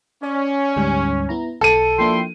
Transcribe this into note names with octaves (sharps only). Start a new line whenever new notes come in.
C#4 D5
D2 G#2 G3
B3 E4 A#5
B1 A4 D#7
F3 A#3 D4 E4 G5 C6